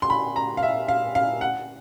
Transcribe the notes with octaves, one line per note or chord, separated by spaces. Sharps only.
C6
B5
A#5
F5
E5
F5
F5
F#5